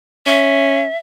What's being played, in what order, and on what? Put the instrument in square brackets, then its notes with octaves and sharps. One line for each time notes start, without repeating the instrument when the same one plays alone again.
[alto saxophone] C#4 [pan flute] E5